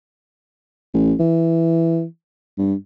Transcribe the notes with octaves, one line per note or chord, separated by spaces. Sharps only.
A1
E3
G2